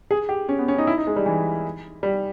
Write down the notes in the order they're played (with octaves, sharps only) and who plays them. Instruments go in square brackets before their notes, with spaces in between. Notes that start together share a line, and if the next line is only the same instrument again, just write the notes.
[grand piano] G#4
G4
C#4
B3
C#4
D#4
E4
D#4
G#3
G3
E3
G3